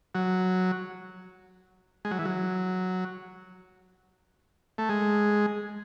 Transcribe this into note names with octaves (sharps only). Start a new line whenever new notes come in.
F#3
G#3
F#3
E3
F#3
A3
G#3